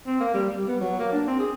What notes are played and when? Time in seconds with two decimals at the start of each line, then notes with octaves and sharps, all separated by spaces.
0.06 C4
0.20 A#3
0.34 G3
0.51 G3
0.68 B3
0.81 F#3
0.99 A#3
1.12 D4
1.27 C4
1.39 G#4